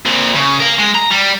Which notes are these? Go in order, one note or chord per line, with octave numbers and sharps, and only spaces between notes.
A#2 C4
C#3
A#4 F5
G#3
A#5
G3